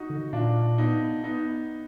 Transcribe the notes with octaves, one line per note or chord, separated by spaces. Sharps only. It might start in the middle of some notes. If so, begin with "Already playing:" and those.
Already playing: D#4 F#4
D3
A#2 D4 F4
B3 D#4
B3 D#4